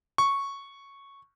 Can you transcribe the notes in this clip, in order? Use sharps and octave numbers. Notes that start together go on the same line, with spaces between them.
C#6